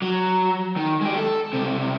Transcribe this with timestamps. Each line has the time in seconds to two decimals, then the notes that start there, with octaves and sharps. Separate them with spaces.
0.02 F#3
0.77 D#3
1.01 G#3 G4
1.17 A4
1.53 C#2 C3